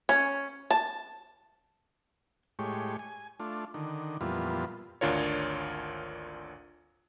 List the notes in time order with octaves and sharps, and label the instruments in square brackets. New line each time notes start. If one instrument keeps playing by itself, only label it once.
[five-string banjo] C#4
A5
[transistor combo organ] A2 G#3 G4 C#5
G#5
A3 D4 F4
D3 D#3
F2 A#2 E3 G3 B3 F4
[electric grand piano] G#1 D2 D4 F4 A#4 C#5